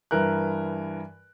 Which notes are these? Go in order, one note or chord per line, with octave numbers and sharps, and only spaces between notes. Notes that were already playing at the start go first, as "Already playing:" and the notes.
G2 E3 A#4 F#6